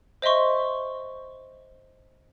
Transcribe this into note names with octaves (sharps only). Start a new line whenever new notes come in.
C5 D#5 E5 C6 C#6